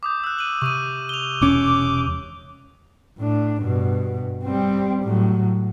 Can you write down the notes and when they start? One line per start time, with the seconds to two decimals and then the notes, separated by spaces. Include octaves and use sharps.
0.03 D6 D#6 G6
0.24 E6 F#6
0.38 D#7 F#7
0.62 C3 C#6 D#6 D#7
1.09 F7 G7
1.41 E1 C#4 D6
3.18 A2 D4
3.63 G2 B2
4.45 G3 C4
5.04 A2 F#3